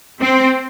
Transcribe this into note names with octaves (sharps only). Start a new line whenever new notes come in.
C4